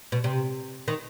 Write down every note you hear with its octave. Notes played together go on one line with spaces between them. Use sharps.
B2
C3
D#3